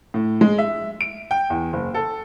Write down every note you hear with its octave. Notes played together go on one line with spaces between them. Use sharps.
A2
G#3
E5
D7
G5
E2
F#1
A4